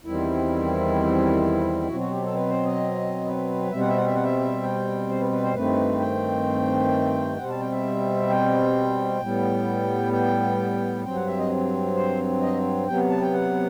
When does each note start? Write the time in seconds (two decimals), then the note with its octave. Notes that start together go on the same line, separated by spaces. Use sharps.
0.05 E2 D#3 G3 C4 E4
1.88 B2 F#3 C4 F#4
2.00 F#4
2.11 G4
2.23 A4
2.34 B4
2.49 C5
2.65 D#5
3.25 B4
3.71 B2 G3 C4 E5
3.80 F#5
3.88 E5
3.97 F#5
4.06 E5
4.15 F#5
4.23 E5
4.63 G5
5.09 C5
5.20 B4
5.31 B4
5.43 C5
5.54 G2 D#3 A3 C4 B4
6.00 G5
7.37 B2 G3 C4 F#5
7.49 A5
7.60 G5
7.72 E5
8.29 G5
9.20 A2 G3 B3
10.13 G5
11.04 G2 F#3 C4 G5
11.16 F#5
11.27 E5
11.38 D#5
11.96 C5
12.41 D#5
12.87 C3 F#3 B3 G5
13.10 A5
13.22 G5
13.33 F#5